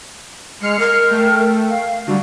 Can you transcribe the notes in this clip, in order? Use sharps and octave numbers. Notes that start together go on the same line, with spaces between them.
G#3 F6 C7 C#7
A#4
A3 G5
F5
D3 G3 F#4